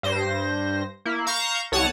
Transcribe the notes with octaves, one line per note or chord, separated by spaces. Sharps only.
G2 C5 A#6
A#3 E4
F5 A#5 C#6 G6 A#6 E7
C2 C#5 F#5 A5 C#7 D#7